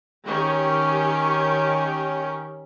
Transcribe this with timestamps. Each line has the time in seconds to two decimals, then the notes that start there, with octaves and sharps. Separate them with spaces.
0.24 D#3 C#4 G4